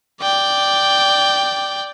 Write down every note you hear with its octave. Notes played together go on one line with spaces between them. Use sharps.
D5 G5